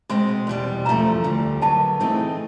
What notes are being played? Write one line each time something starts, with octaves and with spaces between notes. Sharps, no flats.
B2 G#3 C4 C6
E2 B2 G3
E2 C#3 F3 A3 A#5
D2 D3 G3
F#2 D3 F#3 B3 A5
E3 A3 C4 D#4 G#4